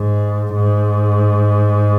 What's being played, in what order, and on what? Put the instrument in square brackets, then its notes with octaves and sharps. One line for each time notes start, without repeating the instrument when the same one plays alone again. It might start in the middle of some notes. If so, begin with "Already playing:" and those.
Already playing: [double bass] G#2
G#2